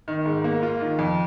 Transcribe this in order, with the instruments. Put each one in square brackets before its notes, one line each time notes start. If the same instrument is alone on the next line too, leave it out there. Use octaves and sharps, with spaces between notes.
[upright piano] D#3
G#2
A#3
F4
D#3
F2